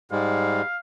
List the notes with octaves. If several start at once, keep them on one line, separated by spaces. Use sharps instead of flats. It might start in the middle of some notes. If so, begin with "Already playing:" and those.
G#2 G3 G#3 F5